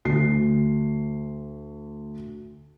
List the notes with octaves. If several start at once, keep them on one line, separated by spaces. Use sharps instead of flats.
D2 C7